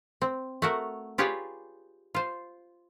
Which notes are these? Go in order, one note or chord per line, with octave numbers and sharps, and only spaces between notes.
C4
A3 F#4 A#4
F4 G4 G#4 B4 C#5 D5
F4 C5